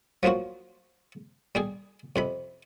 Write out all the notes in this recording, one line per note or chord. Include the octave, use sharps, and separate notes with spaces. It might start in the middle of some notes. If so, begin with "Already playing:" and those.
F3 F#3 A#3 F4 F#4
G3 G4 G#4
F2 C3 B5